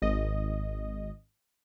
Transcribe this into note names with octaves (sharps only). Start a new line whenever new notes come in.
G#1 D#5